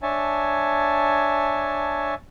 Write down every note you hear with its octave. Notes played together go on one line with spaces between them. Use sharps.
D4 C#5 E5 G#5 A5